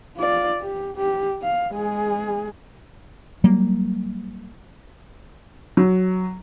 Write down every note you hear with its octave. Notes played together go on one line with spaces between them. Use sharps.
F4 D5
G4
G4
F5
G#3 G#4
F#3 G3 A#3
F#3